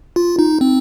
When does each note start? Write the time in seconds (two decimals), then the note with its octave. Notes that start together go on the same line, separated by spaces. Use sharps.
0.16 F4
0.39 D#4
0.61 C4